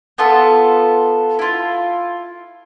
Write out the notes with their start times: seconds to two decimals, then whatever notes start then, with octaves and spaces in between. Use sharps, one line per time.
0.18 B3 F4 A4
1.39 E4 F4